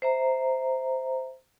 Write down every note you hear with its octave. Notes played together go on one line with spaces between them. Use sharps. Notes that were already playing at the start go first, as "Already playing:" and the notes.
C5 E5 A#5